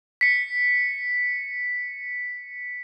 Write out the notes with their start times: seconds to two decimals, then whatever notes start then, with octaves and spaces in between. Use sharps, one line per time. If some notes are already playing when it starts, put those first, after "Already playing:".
0.21 B6 C#7